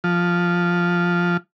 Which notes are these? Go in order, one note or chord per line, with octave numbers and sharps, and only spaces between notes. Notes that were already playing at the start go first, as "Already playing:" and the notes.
F3